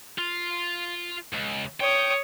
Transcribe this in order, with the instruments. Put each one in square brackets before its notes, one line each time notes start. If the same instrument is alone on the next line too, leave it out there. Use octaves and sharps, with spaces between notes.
[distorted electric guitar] F4
C#2
[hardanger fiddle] C#5 D#6 [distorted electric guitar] G5